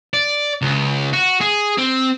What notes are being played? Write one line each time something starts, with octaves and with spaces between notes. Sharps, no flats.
D5
C#2
F#4
G#4
C4